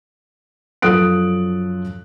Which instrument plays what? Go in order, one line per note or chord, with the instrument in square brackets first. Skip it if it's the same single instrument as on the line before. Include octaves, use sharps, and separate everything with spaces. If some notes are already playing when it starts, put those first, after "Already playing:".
[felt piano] F#2 F3 A4 D#6 F#6 D7